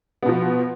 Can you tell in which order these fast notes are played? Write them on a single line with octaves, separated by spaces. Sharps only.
B3 B2 F3